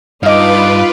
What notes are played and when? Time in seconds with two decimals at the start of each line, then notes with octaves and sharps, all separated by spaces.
0.23 G2 D#4 F4 B4 D#5 F5 D6